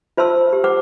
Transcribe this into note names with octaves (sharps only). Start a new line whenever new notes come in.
F4 C5 A5 C6 E6
G4
C5 F#5 D6